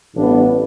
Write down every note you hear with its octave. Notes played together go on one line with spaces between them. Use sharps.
A1 G2 E3 B3 D4